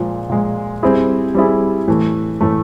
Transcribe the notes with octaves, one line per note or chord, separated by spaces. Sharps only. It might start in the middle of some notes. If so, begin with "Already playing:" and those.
Already playing: A#2 F3 G#3
A#2 F3 G#3
G3 C4 E4 G#4
G3 C4 E4 G#4
A2 E3 A3
A2 E3 A3